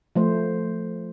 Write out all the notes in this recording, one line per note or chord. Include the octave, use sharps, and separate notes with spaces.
F3 A3 C5